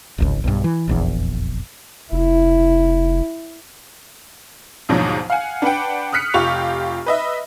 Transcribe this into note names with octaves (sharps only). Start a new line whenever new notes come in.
D1 G#1 C#2
B1 G2
E3
F1 A#1 E2
F1 E4
D#2 G#2 B2 F3 F#3 D4
F5 F#5 G#5
D4 B4 F#5 G5
D#6 F6 F#6 B6 C#7
F1 F4 G4 C#6 F7
B4 D#5 E5